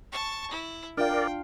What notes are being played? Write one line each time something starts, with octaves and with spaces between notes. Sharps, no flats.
A5 C#6
E4
D4 F4 A#4 D5 F5 G5